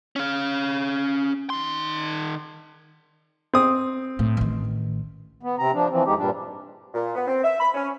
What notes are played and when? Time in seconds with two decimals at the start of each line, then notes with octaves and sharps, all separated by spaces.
0.16 C#4 F5
1.50 D#3 C6
3.54 C4 D#6
4.19 A2
4.37 A1 D#3
5.43 B3
5.59 C3 C4 A#5
5.74 F3 D4
5.90 E3 F3 C4
6.06 F2 G#3 D#4 G4
6.18 G2 A#2 G3 D4
6.94 A#2
7.15 B3
7.27 C4
7.44 E5
7.59 B5
7.74 C#4